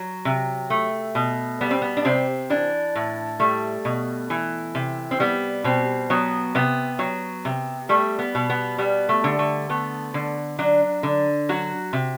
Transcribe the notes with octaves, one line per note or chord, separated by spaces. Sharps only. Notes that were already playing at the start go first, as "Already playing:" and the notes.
Already playing: F#3
C3
A3
B2
G3 B3
C4
B3
D4
C3 C4
E3 D4
A2
G3 A3
B2
E3
C3
C4
G3 B3
B2 C4
F#3 B3
C3 B3
F#3
C3
G3 A3
B3
B2
B3
G3 B3
A3
D3
A3
A3 B3
D3
F#3 D4
D3
F#3 F#4
C3